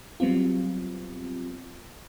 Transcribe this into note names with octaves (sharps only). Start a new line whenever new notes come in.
F#3 G3 B3 C4 F4